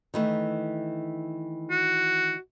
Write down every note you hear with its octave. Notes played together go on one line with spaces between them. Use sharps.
D#3 E3 A3
F#4